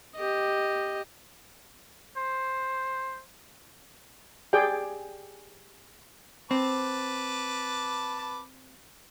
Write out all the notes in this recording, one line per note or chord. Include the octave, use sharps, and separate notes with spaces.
G4 D#5
C5
G4 G#4 D5 G5
C4 B4 A5 D6